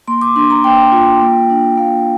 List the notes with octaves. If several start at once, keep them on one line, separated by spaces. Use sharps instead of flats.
A#3 C6
D6
D4 C6
A#5
A#3 G5
F4
A#3
D4
A#3 F5